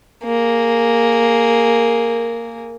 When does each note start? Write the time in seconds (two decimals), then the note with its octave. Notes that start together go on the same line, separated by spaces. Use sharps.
0.25 A#3 G#4